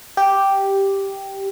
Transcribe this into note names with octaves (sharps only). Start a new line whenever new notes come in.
G4